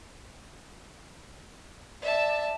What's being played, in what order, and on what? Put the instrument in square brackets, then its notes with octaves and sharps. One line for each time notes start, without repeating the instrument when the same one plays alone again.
[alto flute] D5 [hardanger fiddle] E5 A5